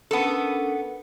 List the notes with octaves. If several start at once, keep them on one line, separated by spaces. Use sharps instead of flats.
B3 C#4 D4 A4 A#4